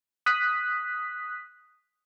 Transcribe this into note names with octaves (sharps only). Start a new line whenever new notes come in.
D#6 F#6 B6